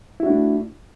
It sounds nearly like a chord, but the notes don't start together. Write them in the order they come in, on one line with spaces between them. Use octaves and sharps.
E4 F#4 D4 A3